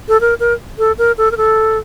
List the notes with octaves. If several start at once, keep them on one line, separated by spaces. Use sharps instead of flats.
A4
A#4
A#4
A4
A#4
A4
A#4
A4